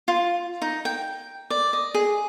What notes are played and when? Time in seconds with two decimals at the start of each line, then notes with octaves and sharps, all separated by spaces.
0.08 F4
0.62 D#4
0.85 G5
1.50 D5
1.73 D#5
1.94 G#4